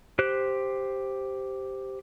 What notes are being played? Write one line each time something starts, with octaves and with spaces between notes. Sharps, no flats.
G4 C5 F#6